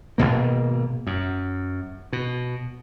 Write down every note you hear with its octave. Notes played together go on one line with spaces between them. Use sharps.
G#1 D#2 B2 A#3
F#2
B2